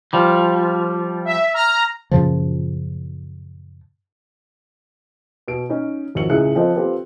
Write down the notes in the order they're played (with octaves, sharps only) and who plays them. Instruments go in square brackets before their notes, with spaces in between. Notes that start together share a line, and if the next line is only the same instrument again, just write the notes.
[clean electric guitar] F3 G3
[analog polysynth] E5
A#5 F6
[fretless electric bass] F#2 A#2 C#3 F3
[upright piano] B2 D7
C#4 D#4
G#1 F2 F#4 C#5 C#7 F#7
C#2 A2 G#4 F#6 C#7
F3 C4 A4 D#5
C4 F4 G4 A4 B4